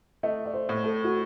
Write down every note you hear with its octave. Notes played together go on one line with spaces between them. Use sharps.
A3 D#5
D5
C5
A2
A4
F#4